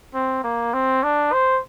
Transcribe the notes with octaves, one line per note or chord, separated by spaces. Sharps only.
C4
A#3
C4
D4
C5